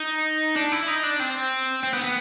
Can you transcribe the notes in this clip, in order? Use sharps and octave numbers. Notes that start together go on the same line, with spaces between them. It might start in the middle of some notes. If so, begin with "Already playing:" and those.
Already playing: D#4
D4
E4
D#4
D4
C4
C4
B3
B3